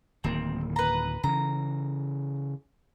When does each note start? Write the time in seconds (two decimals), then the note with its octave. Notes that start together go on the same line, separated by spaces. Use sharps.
0.24 D1 D#3 A#3 C4
0.76 B4 A#5
1.24 C#3 E3 A#5